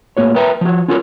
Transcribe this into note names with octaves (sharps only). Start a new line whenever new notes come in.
A2 A#3 F#4 C#5
A#4 B4 E5 G5 A5 A#5
F3 F#4
C#4 F4 F#4 A4 A#4